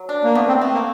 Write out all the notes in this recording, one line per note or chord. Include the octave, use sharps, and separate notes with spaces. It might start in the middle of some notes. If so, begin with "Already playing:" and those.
Already playing: F#3
D4
A#3
A3 B3
C4
A3 B3
A#3